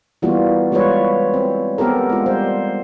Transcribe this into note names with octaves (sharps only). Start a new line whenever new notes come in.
E3 G3 A#3 B3 F4 F#4
E3 G3 G#3 F4 B4 C#5
C4
B3 C4 G4 A4 A#4
G#3 F4
G3 C5